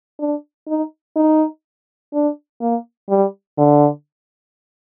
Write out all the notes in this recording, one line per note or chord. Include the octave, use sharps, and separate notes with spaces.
D4
D#4
D#4
D4
A#3
G3
D3